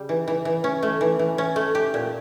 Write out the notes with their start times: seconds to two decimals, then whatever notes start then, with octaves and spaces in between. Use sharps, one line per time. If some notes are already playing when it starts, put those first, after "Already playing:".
Already playing: C#3 G3
0.09 E3
0.28 E3
0.45 E3
0.64 C#4
0.83 A3
1.01 E3
1.19 E3
1.38 C#4
1.56 A3
1.75 G4
1.94 A#2